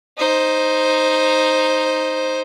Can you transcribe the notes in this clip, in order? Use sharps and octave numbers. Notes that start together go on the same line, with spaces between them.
D#4 C5